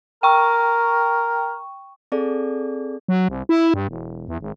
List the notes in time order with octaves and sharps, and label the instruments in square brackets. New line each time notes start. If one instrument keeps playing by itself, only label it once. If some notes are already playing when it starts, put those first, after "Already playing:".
[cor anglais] A#4 [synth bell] G5 C#6
[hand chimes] C4 G#4 A4 D5
[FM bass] F#3
C2
E4
G2
E1
E2
G#1